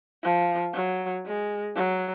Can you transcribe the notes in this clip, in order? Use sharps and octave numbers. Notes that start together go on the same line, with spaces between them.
F3
F#3
G#3
F#3